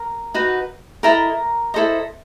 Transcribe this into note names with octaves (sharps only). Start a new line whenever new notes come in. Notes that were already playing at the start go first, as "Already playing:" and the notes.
Already playing: A#4
D#4 F#4 B4
E4 A4 A#4 D#5 A#5
E4 A4 C5 D#5